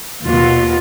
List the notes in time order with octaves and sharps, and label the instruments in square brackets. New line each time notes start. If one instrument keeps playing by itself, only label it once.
[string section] D#2 B2 [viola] F4